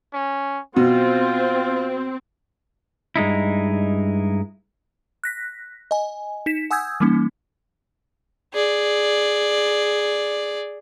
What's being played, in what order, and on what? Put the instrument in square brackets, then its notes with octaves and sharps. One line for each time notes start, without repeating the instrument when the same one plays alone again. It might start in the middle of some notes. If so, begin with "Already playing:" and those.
[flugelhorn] C#4
[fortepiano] B2 [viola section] C4 [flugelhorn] F4
[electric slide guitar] G2 G#3 D#4 E4
[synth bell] F#6 A#6 B6
D#5 G#5
D#4 B6 E7
F#5 G#5 D#6 E6 G6 G#6
E3 G3 A#3 C#4 D#4
[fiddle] G#4 D5